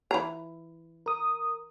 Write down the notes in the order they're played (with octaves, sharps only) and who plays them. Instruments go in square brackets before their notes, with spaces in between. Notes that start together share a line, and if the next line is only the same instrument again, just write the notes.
[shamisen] E3 A#5
[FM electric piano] A#4 D#6